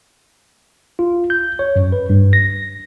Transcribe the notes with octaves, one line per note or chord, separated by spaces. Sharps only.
F4
G6
C#5
F#2
B4
G2
A#6